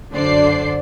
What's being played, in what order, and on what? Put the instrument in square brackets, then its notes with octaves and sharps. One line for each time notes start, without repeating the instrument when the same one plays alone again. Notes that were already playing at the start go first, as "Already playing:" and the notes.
[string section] F#2 D3 D4 C5 D5 C7